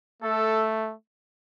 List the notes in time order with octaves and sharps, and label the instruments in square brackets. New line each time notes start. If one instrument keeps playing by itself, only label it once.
[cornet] A3 [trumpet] A4